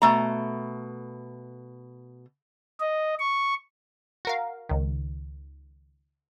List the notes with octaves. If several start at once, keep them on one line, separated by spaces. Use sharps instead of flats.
B2 A3 A#5
D#5
C#6
F#4 A#4 F5
C#2 D#3